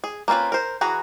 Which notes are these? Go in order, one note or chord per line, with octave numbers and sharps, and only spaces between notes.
G#4
A#3 C4 C#4 F4 B4
A#4 C5
E3 F#4 G#4 A#5